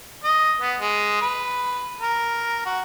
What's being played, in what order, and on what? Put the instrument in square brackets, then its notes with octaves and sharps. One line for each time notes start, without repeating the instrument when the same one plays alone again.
[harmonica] D#5
B3
G#3
B4
A#4
F#4